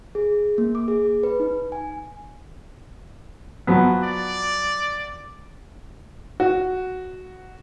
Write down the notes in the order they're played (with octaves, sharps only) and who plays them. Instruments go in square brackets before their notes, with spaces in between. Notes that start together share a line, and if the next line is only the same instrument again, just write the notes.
[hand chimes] G#4
A#3
D6
G#4
B4
D#4
G#5
[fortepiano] F3 F#3 B3
[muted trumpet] D5
[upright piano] F#4